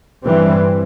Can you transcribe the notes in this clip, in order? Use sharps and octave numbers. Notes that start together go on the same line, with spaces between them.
G2 E3 G3 C4